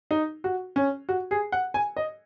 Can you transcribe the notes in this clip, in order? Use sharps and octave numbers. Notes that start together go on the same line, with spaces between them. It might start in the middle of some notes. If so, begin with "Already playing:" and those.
D#4
F#4
C#4
F#4
G#4
F#5
G#5
D#5